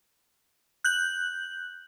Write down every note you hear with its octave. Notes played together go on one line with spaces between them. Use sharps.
F#6 G6 F#7